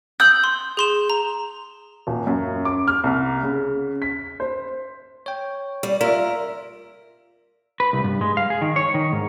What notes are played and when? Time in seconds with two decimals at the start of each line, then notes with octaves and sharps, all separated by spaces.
0.20 D#6 E6 G6 F#7
0.44 C6
0.77 G#4 C6 E7
1.10 A#5
2.07 D#1
2.27 F#2
2.65 D6
2.88 F6
3.04 C2
3.43 C#3
4.02 B6
4.40 C5
5.26 C#5 G5
5.83 G3
6.01 F4 A#4 E5
7.80 B4
7.93 C2
8.04 G2
8.21 G#3
8.37 F5
8.50 G#4
8.61 D#3
8.76 C#5
8.94 D#3
9.12 G#2